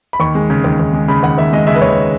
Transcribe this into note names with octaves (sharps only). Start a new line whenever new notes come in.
B5
D#2 C#6
G#3
C#3
D#2
D#2
G#3
C#3 B5
D#2 F#5
D#2 E5
G#3 D#5
C#3 E5
B4
D#2 C#5